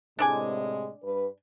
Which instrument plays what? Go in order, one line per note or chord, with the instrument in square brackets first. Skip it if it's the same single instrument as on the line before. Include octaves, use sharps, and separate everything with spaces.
[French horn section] A2 C3 G#3 [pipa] D4 D5 G#5
[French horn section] G2 B4